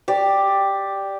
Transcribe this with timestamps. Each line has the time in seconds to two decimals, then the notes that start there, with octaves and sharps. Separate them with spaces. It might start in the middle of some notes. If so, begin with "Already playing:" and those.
0.08 G4 D5